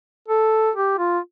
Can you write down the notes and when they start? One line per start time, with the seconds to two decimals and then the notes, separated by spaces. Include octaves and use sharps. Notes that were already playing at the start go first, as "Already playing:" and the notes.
0.28 A4
0.75 G4
0.98 F4